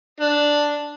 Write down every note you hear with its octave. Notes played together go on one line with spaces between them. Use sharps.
D4